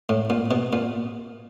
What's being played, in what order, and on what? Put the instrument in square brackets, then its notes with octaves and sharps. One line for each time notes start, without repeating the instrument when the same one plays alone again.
[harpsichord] A2
A#2
B2
A#2